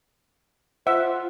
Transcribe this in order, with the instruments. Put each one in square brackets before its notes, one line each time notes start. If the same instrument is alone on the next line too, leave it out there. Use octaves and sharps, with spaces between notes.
[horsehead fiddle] F4 [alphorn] C5 [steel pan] E5 [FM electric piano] F#5